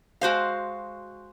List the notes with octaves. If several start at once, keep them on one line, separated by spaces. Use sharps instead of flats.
G#3 F#4 C5 F5